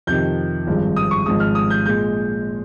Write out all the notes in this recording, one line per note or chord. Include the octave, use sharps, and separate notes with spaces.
F2 C3 D#3 G6
G#1 G2 F3 G#3
D#6
C#6
G#1 G#2 F3 G#3 D#6
F6
D#6
G6
A#2 G#3 G6